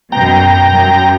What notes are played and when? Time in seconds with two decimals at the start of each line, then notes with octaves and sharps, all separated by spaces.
0.12 F#2 B2 G5 A#5
0.72 F#2